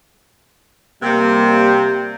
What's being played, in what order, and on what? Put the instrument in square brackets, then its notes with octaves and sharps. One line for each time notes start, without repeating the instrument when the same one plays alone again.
[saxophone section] C3 [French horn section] G3 A#3